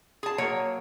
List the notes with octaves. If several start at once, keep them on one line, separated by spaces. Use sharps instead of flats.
G#4 A5
F#3 A#3 C#5